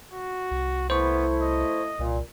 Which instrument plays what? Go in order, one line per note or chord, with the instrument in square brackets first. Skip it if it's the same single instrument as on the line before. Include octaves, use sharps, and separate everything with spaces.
[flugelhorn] F#4
[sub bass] C2
[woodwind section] A3 E4 [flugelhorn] B3 [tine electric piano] C5 C#6
[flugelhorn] D#5
[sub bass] C2 [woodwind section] A#2